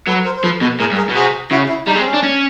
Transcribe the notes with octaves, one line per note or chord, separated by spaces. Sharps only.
F#3 A4 B4
A#4 C5
C5
F3 A4 B4
B2 A4 B4
A2 G#4 A#4
G2
G#4 A#4
B2
C3 F#4 G#4
C#3 E4 F#4
E4
G3 D#4
G#3
C4
C#4
D4
C#4